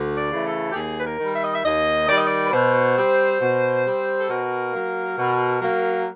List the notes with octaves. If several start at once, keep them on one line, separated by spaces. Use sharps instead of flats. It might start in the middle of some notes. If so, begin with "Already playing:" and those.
Already playing: D2
D5
C#3 E3 A3
A4
G4
D#2 G#4
B4
A#4
D#3 G3
E5
D#5
E5
D#2 D#5
D#3 G3 D5
D#5
D5
B4
B2 C5
G3 C4
B2
G3 C4
A4
B2 A#4
F#3 A#3
B2
F#3 A#3